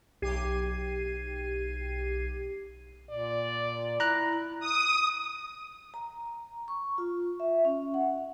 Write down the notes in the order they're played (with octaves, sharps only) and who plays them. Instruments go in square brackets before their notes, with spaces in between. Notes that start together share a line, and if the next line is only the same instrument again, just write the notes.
[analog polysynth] B1 G4 G#6 C7 D#7
[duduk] A#2 [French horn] D5
[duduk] E4 [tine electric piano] A#5 F#6
[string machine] D#6
[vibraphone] A#5
C#6
F4
E5
C#4
F#5